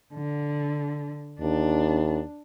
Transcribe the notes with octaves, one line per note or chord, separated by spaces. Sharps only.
D3
D#2 D4